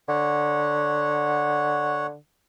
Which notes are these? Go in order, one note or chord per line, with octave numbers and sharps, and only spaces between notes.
D3 C#5 F#5